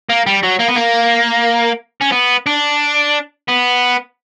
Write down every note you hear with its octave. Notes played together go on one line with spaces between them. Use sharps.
A#3
G3
F#3
A#3
B3
A#3
C#4
B3
D4
B3